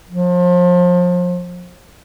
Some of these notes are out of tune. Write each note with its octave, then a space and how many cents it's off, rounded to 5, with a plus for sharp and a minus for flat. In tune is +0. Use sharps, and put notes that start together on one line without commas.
F3 +30